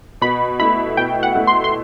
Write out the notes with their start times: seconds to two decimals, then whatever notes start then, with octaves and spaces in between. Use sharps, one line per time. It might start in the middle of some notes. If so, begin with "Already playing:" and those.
0.21 B2 B5
0.60 A3 E4 B5
0.97 B2 G5
1.23 F#5
1.35 A3 E4
1.47 C6
1.64 C6